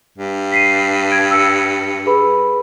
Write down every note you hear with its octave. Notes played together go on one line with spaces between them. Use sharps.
G2
B6 C7 D#7
G#6 D7
E6 C#7
G#4 B4 B5